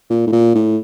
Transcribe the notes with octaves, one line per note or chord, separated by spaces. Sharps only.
A#2
A2
A#2
A2